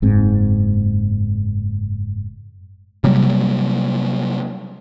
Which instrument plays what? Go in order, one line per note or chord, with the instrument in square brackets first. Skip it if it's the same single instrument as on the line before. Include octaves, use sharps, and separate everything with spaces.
[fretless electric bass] F#1 G#2 C4
[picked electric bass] C3 F#3 G3 A#3